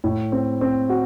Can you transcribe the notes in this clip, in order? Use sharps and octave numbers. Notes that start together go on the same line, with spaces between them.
A2
C4
C4
F#4